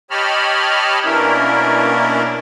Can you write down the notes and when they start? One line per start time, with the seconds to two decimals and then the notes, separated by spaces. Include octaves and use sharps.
0.11 G4 C#5 D#5 A5 B5 F6
1.05 B2 A#3 C#4 D4 E4 A#4